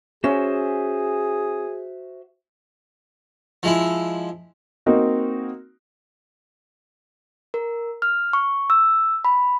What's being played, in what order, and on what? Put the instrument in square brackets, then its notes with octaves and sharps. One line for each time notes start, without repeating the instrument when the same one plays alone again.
[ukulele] C#4 [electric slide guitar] F#4 C5 E5 [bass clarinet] G#4
[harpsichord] F3 G#3 E4
[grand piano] A#3 C4 D#4 F#4
[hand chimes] A#4
F6
C#6
E6
B5